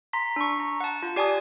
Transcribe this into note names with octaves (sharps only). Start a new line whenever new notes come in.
A#5 C6 B6
D4 C#6
A#5
F#5 A5
F4
G4 D5 G#5 A5 D#6